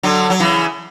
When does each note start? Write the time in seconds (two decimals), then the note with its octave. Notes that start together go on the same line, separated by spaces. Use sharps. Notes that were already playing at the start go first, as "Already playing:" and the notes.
0.03 D3 F#3
0.30 F#3
0.40 C#3 E3